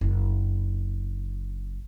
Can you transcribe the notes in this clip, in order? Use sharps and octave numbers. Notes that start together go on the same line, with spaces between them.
F#1 D4